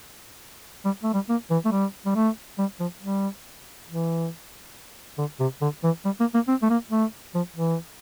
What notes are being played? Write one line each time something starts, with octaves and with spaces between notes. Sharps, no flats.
G3
A3
G3
A#3
E3
A3
G3
G3
A3
G3
F3
G3
E3
D3
C3
D3
E3
G3
A#3
A#3
C4
A3
A#3
A3
F3
E3